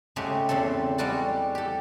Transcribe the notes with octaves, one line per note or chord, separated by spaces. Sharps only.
C#3 G#3 A3 F#4 G4
E2 C#3 C4 A4
G3 G#3 F#4 A4 D5
G4 A4